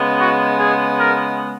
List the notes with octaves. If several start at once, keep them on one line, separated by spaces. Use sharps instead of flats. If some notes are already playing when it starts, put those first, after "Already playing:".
Already playing: C#3 G#3 B3
F#4
G#4
A#4